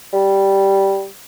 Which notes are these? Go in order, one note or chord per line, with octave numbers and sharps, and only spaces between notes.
G3